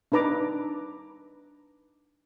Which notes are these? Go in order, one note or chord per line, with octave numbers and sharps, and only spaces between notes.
D4 D#4 B4 A#5 D6